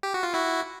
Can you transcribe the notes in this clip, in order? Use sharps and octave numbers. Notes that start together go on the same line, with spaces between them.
G4
F#4
F4
E4 F#4